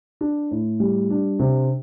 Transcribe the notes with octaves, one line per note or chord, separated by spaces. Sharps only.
D4
A2
G3
D4
C3